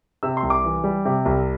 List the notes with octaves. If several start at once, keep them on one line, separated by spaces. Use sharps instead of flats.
C3 E6
C6
C2
D6
E3
G3
C3
C2